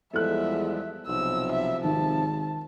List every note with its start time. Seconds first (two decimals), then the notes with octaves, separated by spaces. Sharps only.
0.13 E2 F3 G3 G#3 A4 E5 F#6
1.07 B1 C3 F3 E6
1.52 E5
1.84 G#1 D#3 A5